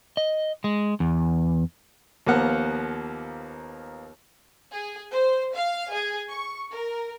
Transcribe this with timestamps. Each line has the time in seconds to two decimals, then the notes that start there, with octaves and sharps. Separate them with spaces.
0.17 D#5
0.64 G#3
1.00 E2
2.27 D#2 F3 A#3 B3 F#5 F6
4.71 G#4
5.12 C5
5.54 F5
5.91 G#4
6.29 C#6
6.71 A#4